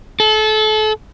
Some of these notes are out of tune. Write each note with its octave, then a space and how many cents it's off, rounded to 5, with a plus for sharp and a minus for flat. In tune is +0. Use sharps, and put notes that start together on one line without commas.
A4 -30